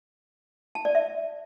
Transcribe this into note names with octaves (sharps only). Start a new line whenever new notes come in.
A5
D5
E5